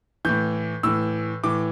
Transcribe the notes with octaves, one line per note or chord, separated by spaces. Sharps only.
A2 E3 G6
A2 E3 E6
A2 E3 D6